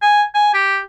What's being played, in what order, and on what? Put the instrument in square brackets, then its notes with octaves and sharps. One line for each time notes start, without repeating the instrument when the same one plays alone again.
[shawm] G#5
G#5
G4